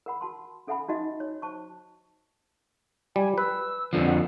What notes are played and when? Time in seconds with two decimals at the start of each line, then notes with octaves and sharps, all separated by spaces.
0.06 A#4 F#5 B5
0.21 F#4 A5 C6
0.67 C#4 A4 E5 F#5 G#5 B5
0.88 D#4 F#4 D#5 E5
1.20 C#5
1.42 C5 A5 C#6
3.16 G3 G#5
3.38 B4 E6
3.93 F2 D3 F3
4.06 F#5